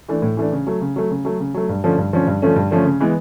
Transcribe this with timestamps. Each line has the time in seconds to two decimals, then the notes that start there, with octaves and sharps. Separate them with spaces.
0.09 E3 A3 D4
0.22 A2
0.37 E3 A3 D4
0.52 C#3
0.67 F#3 A3
0.81 C#3
0.96 F#3 A3
1.11 C#3
1.25 F#3 A3
1.40 C#3
1.54 F#3 A3
1.69 G2
1.84 D3 F3 A3 C#4
1.98 G2
2.13 D3 F3 A3 C#4
2.27 G2
2.42 D3 F3 A3 C#4
2.56 G2
2.71 D3 F3 A3 C#4
2.85 C#3
3.00 E3 G#3 B3